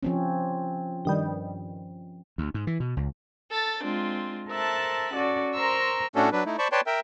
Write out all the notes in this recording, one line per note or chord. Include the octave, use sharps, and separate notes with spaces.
F3 C4 C#4
G2 D#3 G3
D2
G#2
E3
B2
C#2
A4 A6
G#3 C4 D4 F4
A4 A#4 C5 E5 A5 F#6
C#4 F#4 A4 D5
A#4 C5 A#5 C6 C#6 E6
A2 A3 C#4 D4 F#4 A4
F#3 D4 B4
A3 D#4 E4
C5 D5 A5 B5 C#6
B4 C#5 D5 G5 A5 C6
A#4 E5 G5